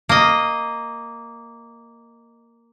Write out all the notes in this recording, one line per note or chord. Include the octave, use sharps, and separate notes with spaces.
A#3 D#5